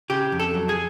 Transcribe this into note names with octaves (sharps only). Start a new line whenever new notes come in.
C#3 G4
F2
A4
F#3
G#4